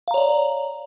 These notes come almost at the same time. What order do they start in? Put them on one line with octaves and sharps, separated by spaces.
F5 A#5 C#5 D5